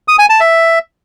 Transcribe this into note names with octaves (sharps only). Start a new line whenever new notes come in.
D#6
G#5
A5
E5